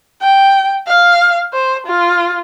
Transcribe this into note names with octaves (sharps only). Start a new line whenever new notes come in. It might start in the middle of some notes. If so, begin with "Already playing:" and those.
G5
F5
C5
F4